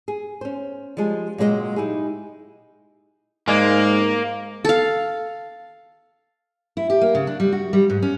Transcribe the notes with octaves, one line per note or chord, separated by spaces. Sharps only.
G#4
C#4 C5
F3 G3 G#3 G#4
A#2 C#3 F#3 G#3 B4 D#5
D#4 E4 G4 G#4
G#2 G#3 A#3 G#4 D5
A4 F5
E4
G4
A#3
C#3
D4
G3
F#4
G3
G#2
C#4